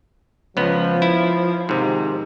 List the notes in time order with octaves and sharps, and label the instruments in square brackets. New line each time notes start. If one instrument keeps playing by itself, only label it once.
[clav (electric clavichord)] C#2 B3 [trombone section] F3
[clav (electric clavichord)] E4
[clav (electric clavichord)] G#2 C3 [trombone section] D#3